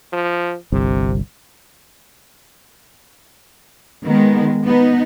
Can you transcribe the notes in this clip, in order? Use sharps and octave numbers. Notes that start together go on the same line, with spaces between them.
F3
G1 C2 C3
D#3 G#3 B3
B3 D#4